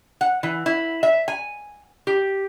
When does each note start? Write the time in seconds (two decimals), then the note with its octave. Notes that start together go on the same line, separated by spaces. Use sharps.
0.21 F#5
0.43 E3
0.66 E4
1.03 E5
1.28 G#5
2.07 G4